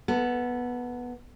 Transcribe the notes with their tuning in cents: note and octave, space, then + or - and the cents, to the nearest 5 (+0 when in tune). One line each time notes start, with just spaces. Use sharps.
B3 -10 A4 +25